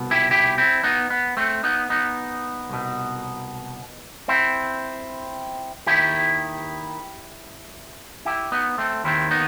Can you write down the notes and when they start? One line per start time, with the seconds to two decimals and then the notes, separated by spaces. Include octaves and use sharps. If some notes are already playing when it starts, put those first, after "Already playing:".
Already playing: C2 B2
0.11 E4 G4
0.31 E4 G4
0.58 C4 E4
0.83 B3 D#4
1.10 B3
1.37 A3 C4
1.63 B3 D#4
1.90 B3 D#4
2.69 C2 B2
4.28 C4 E4
5.87 D#2 D#3 E4 G4
8.25 E4 G4
8.52 B3 D#4
8.78 A3 C4
9.04 D#2 D#3 C4 E4
9.31 B3 D#4